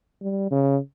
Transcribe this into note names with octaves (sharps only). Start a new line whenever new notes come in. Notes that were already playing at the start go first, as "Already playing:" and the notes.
G3
C#3